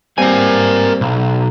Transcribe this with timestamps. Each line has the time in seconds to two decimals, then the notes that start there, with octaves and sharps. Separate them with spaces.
0.18 G3 A#3 C4 A#4 G#5
1.01 B1